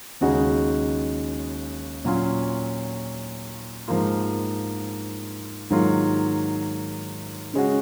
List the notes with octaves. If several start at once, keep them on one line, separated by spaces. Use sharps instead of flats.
D#2 C#3 G#3 D#4 F#4
A#2 F#3 C#4 F4
G#2 F3 A#3 F4
G#2 D#3 F#3 A#3 F4
C#3 G#3 C#4 F#4